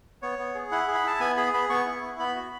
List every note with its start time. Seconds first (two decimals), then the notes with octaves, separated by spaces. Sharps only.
0.22 B3 C#5
0.39 B3
0.55 G#4
0.72 E4 F#5
0.88 G#4
0.95 B5
1.04 E4 A5
1.20 B3 G#5
1.37 G#4 B5
1.54 B3 B5
1.70 B3 C#6
1.86 E4
2.02 B3
2.19 B3 B5
2.36 F#4